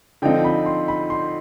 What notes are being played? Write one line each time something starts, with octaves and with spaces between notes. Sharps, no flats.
D3 F3 C4 D#4 G5
B5
C6
B5
C6